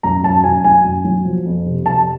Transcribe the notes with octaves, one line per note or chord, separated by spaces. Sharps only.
F#2 A#5
F#2 A5
F#2 G#5
F#3 G#5
F#2
F#3
F3
F2
C3
F2 A5